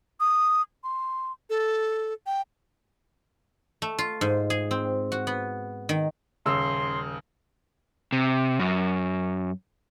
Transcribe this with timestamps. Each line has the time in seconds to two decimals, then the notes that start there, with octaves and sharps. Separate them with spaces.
0.20 D#6
0.84 C6
1.50 A4
2.26 G5
3.82 A3
3.98 F4
4.21 G#2
4.50 G#4
4.71 C4
5.12 F#4
5.27 B3
5.89 D#3
6.46 D#1 C#3 C6 E6
8.12 C3
8.59 F#2